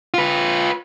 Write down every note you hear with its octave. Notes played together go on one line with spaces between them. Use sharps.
F4 B4